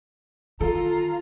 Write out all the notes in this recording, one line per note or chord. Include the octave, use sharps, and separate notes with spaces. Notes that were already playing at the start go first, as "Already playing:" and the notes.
D#3 F4 A4 A#5